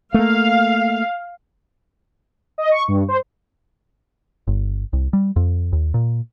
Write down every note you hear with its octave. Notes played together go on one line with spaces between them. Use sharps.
A3 A#3 F5
D#5
C#6
G2
C5
G1
C2
G3
F2
D#2
A#2